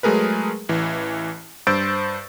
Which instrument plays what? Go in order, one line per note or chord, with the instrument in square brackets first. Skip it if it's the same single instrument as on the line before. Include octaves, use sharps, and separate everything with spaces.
[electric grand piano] F#3 G#3 A3 G#4 A#4 B4
A1 E3
G2 C5 E6 G6 A6 D7